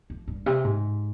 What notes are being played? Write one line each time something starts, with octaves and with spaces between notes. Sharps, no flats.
F2
G2
C3
G#2